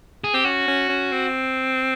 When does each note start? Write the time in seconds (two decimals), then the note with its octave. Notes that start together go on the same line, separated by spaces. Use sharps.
0.24 G#4
0.34 C4 G4
0.44 C#4 F#4
0.68 C#4
0.89 C#4
1.12 C4